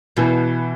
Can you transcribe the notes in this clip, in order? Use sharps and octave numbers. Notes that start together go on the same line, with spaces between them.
B2 E3